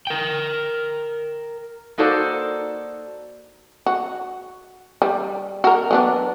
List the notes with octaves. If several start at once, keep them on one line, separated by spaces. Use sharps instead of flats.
A#4 G5
A#3 D#4 F#4 A4 C5 D5
F#4
G3
F#4 A#4
F#3 B3 D4